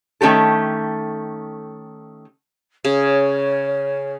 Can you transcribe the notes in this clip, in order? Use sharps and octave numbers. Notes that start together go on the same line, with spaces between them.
D#3 A3 C#4 G4 A4
C#3 C#5